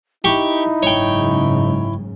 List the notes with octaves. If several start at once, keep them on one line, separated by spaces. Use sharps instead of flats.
D#4 E4 G4 C#6
F#1 G#2 C#3 C#5 G5